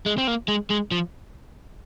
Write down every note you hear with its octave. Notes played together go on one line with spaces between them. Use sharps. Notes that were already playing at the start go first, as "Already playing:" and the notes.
G#3
C4
A#3
G#3
G#3
F3